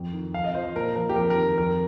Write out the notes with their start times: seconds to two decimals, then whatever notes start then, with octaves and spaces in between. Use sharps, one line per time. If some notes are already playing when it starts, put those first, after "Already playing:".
Already playing: F2
0.13 D#3
0.34 F2 F5
0.44 D#5
0.54 F3 C5
0.65 C5
0.75 A#2 A#4
0.96 F3 A#4
1.09 G4
1.16 F2 A#4
1.30 A#4
1.38 D#3
1.58 F2 A#4